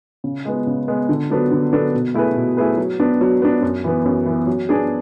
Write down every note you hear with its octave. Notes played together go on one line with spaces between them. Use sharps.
C#3
G#3 B3
C#3
G#3 B3
D3
F#3 B3 D4 A4
D3
F#3 B3 D4 A4
B2
A3 E4 G#4 B4
B2
A3 E4 G#4 B4
F#3
B3 D4
F#3
B3 D4
F#2
E3 B3
F#2
E3 B3
F#3
B3 D4 G#4